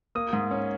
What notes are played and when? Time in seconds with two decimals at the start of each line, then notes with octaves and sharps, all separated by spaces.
0.15 A#3 D#6
0.33 G#2
0.51 C#4